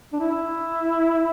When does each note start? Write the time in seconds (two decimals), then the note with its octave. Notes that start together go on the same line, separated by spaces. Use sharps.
0.13 D4
0.20 E4